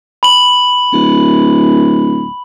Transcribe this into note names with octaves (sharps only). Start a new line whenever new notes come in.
B5 F#7
D1